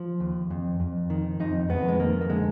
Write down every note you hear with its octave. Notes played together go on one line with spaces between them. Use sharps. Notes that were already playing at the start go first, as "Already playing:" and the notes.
Already playing: F3
D#2
F2
F2
D#3
F2 D#4
F2 B3
G#3
D#3 A#3
A#3
D3 G#3